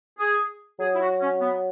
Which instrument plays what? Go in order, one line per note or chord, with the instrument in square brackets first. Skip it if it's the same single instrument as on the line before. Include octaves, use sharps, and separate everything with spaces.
[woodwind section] G#4
[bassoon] F#3 [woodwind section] G#4
[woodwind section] E4
F#4
C#4
B3